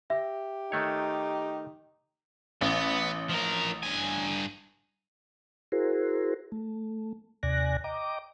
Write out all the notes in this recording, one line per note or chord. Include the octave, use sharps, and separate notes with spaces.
G4 E5
D#3 A3 D#4 C#5
A1 B3
F3 A#4
G2 G#5
E4 F#4 G#4 A#4 C5
A3
D#2 C3 D5 G#5 F#6 A#6
D#5 G5 A#5 D6